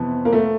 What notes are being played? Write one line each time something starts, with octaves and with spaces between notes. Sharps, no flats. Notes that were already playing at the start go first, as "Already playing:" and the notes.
Already playing: F2 C3 E3 B3
A#3
A3